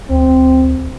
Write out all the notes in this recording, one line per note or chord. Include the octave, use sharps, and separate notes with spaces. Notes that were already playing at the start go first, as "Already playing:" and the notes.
D2 C4